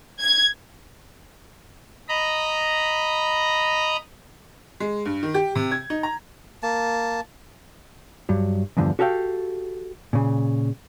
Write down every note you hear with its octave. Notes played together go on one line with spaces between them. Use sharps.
G#6
D#5 A#5 B5
G#3
G2
D#3
G4
C3
G#6
D#4
A#5
A#3 A5
G2 F#3
E2 G2 D3 F3
F#4 G4 A4 F5 G5
A#2 C#3